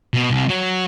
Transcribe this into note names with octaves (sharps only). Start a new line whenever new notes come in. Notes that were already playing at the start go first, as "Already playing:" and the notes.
B2
C2
F#3